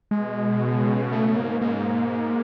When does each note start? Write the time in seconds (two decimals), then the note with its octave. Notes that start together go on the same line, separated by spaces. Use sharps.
0.11 B2 G#3
0.62 C#3
1.12 G#2 A3
1.37 A#3
1.62 A#3